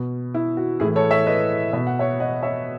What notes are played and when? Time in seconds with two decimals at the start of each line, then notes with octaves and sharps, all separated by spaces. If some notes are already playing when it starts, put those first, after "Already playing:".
Already playing: B2
0.34 E4
0.57 F#4
0.80 A2 E3 E4 G#4
0.96 A4 C#5
1.11 C#5 E5
1.26 B4 D#5
1.73 B2 E5
1.87 F#5
1.99 C#5 E5
2.20 D#5 F#5
2.43 C#5 E5